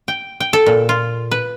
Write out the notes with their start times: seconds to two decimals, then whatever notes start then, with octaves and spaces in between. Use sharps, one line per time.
0.08 G5
0.40 G5
0.53 A4
0.66 A#2
0.89 F4
1.31 B4